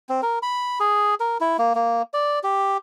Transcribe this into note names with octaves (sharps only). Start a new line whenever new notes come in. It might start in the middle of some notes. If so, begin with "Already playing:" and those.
C4
A#4
B5
G#4
A#4
E4
A#3
A#3
D5
G4